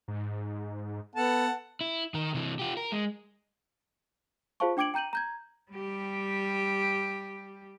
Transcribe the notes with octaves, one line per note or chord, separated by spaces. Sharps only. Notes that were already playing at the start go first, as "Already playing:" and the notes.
G#2
B3 A4 F#5 A5
E4
D#3 A#4
C3 E3
F4 G4
A#4
G#3
F4 G#4 C5 F5 A5 C#6
D4 G5 D6 G#6 D7 F#7
G5 A#5 G6 D#7 F#7
A#5 G6 G#6
G3 G4